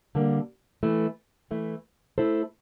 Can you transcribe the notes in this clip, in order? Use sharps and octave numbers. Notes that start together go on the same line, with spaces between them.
D3 G3 A#3
E3 A3 E4
E3 A3 E4
A3 E4 A4 C5